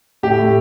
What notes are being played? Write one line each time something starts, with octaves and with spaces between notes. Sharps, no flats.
A2 G4
A2